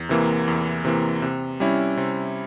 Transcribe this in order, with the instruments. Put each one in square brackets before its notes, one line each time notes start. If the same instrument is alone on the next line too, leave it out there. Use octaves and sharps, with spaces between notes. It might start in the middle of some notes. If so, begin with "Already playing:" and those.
Already playing: [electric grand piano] E2
C3 E3 A#3
E2
C3 E3 A#3
C3
G3 C#4 E4
C3